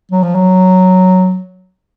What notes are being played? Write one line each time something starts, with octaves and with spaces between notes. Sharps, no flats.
F#3
F3
F#3